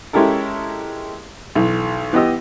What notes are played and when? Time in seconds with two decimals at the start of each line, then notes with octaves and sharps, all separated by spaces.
0.13 G#3 C#4 E4 G4 A4 A#4
1.55 B1 E3
2.13 E3 B3 G4 D#5 E6